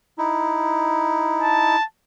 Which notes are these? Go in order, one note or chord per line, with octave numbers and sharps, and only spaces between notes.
D#4 E4
A5